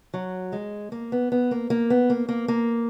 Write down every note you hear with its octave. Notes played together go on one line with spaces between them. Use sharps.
F#3
G#3
A#3
B3
B3
A#3
A#3
B3
A#3
A#3
A#3